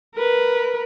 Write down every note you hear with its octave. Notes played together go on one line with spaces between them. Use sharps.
A#4 B4